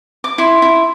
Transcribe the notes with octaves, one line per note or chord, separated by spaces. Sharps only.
D6
E4 C6
E4